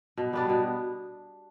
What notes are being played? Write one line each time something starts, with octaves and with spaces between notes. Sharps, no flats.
B2
G3 B3 D4
B2